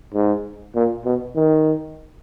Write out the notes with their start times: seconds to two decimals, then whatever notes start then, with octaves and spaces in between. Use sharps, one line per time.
0.14 G#2
0.75 A#2
1.05 B2
1.36 D#3